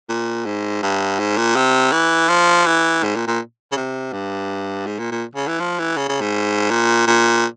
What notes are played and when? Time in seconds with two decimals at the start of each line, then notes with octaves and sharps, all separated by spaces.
0.09 A#2
0.45 G#2
0.82 G2
1.19 G#2
1.37 A#2
1.56 C3
1.93 E3
2.29 F3
2.66 E3
3.03 G#2
3.15 A#2
3.27 A#2
3.72 C#3
3.76 C3
4.13 G2
4.86 G#2
4.99 A#2
5.11 A#2
5.35 C#3
5.47 E3
5.60 F3
5.79 E3
5.97 C#3
6.09 C#3
6.21 G#2
6.70 A#2
7.07 A#2